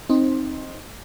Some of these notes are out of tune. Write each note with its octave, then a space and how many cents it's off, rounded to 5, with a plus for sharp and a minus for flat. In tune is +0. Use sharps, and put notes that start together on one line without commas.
C4 +15 D#4 +0